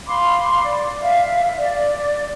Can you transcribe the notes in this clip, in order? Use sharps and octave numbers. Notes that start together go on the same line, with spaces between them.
F5 B5 C6 D6
D5
E5 F5
D5